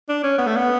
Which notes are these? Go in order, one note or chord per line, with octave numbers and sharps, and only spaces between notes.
D4
C#4
B3
A3
B3